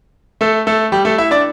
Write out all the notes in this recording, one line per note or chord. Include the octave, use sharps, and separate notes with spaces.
A3 A4
A3 A4
G3 G4
A3 A4
E4 E5
D4 D5